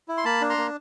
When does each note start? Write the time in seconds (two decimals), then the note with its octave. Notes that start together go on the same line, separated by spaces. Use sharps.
0.08 E4
0.17 C6
0.25 A#3 A5 B5
0.41 D4
0.50 A#5 C6
0.58 A#3